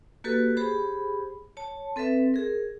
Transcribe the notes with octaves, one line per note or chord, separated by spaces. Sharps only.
A#3 F#4 G4 A4 B4
G4 G#4 C5 B5
C#5 A5
C4 A4 B4 E5
G#4 A#4